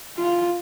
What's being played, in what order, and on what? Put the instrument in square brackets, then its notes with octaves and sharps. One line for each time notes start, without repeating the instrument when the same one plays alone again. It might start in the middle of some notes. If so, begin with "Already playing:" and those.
[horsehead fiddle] F4